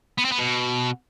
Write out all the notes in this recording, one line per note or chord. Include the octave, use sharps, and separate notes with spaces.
B3
C4
B3
B2